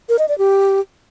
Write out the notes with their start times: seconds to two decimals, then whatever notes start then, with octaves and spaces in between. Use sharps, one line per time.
0.09 A#4
0.19 D#5
0.29 D5
0.38 G4